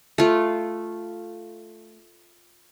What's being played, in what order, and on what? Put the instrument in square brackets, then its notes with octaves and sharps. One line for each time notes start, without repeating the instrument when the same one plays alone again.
[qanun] A3 F4